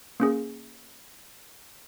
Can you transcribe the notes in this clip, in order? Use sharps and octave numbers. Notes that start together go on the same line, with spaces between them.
A#3 C#4 G#4